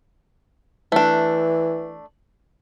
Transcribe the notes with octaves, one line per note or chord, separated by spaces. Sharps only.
E3 A3 D4